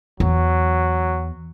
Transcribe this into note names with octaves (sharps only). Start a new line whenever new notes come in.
E2 F#3